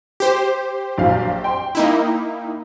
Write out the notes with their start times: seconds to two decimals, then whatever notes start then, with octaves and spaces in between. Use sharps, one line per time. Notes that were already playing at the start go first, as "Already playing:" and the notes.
0.20 G4 C5
0.98 A#1 F#3 F5
1.44 G5 C6
1.75 A#3 D#4 E4